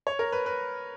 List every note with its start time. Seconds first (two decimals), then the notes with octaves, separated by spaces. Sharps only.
0.07 C#5
0.19 A#4
0.32 B4
0.46 B4